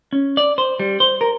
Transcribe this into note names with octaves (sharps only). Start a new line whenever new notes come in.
C#4
D5
C5
G3
C5
A#4